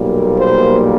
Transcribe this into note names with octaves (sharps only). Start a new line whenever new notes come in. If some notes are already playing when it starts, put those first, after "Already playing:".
Already playing: B1 A#2 G3 A#3
C5